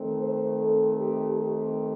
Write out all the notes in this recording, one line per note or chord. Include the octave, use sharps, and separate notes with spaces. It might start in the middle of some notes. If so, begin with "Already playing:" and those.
Already playing: D#3 A3 C4
C5
A4
G4
G4